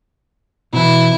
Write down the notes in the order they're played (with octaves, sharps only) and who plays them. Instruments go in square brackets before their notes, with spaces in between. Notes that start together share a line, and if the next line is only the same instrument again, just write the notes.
[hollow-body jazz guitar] B2 E3 [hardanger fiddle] E4